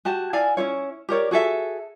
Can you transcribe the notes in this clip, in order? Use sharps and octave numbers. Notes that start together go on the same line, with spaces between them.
F#4 G4 A5
E4 D5 F5 G#5
C#4 E4 F4 C#5
G4 A#4 C#5 D5
F#4 G#4 A4 E5